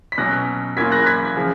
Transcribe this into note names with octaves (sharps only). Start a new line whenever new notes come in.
B6
B2 F#3 C#4 F#6 A#6
F#3 A#3 C#4 F4 G#6 B6
F#6 A#6
G#6 B6
C#3 F3